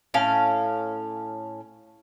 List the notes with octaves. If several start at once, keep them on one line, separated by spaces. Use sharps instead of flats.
A2 C#4 F5